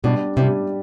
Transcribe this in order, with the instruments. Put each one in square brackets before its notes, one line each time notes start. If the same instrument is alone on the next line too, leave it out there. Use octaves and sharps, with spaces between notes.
[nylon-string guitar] B2 [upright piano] G3 D4 G4
[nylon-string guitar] C3 [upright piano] G3 D4 G4